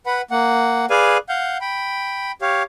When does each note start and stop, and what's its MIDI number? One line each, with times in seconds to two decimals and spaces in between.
0.06 0.22 71
0.06 0.22 78
0.06 0.22 83
0.31 0.86 58
0.31 0.86 78
0.90 1.18 68
0.90 1.18 71
0.90 1.18 74
0.90 1.18 77
0.90 1.18 80
1.29 1.58 77
1.29 1.58 78
1.29 1.58 91
1.61 2.32 79
1.61 2.32 83
2.42 2.63 67
2.42 2.63 73
2.42 2.63 77